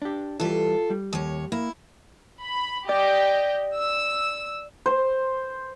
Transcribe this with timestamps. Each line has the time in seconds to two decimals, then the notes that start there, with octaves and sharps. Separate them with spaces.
0.02 D4 G4
0.40 E3 G3 F4 A4
0.90 G3
1.13 D#2 C#5
1.52 A#3 E4
2.43 B5
2.89 G4 D5 D#5 G5
3.75 E6
4.86 C5